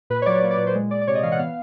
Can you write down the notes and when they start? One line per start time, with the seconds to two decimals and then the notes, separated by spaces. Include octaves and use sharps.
0.10 A#2 B4
0.22 C#5
0.26 F#3 D5
0.42 A#3
0.51 D5
0.58 A#2
0.67 C5
0.75 G#3
0.91 G#3 D5
1.02 D5
1.07 C3 C#5
1.15 D#5
1.23 E3 F5
1.32 F#5
1.39 B3 F5